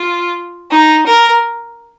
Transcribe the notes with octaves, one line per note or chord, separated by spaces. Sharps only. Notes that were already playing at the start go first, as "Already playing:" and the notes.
Already playing: F4
D#4
A#4